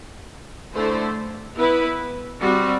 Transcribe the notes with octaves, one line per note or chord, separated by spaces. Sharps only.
D3 A3 E4 A4 C5
B3 E4 B4
G3 C4 F#4